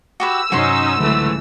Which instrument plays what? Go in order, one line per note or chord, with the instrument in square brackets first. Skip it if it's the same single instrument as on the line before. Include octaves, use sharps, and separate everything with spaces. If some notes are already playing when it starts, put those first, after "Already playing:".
[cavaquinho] F#4 G4 B4 [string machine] E6
[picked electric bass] G2 C3 F#3 [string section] C#4 D#4 [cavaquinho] F#4 C5 C6
[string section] C#2 E3 A3 [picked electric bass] A2 D3 F#3